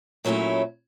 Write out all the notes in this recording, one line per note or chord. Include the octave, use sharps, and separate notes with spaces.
A#2 F#3 A3 C#4 E4